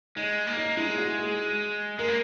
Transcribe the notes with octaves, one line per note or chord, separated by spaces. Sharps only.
G#3 D#4
A#3
D#4
G#3 E4
G#4
F#4
G#4
G#3 A#4
A#3